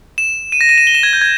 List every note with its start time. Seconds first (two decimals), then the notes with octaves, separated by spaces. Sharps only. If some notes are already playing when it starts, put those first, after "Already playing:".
0.18 E7
0.52 D#7
0.61 A#6
0.69 D#7
0.78 E7
0.87 G7
0.95 E7
1.03 G#6
1.13 G6
1.22 G#6